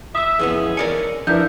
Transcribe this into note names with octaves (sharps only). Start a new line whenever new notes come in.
E5 D#6 E6
F2 E3 G#3 B3 C#4 G#4
A#4 D5 G#5 C#7
F3 D4 E4 A#4 B4 E5 G6